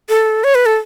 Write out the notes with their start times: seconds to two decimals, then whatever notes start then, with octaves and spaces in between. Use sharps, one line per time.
0.09 A4
0.44 C#5
0.55 B4
0.66 A4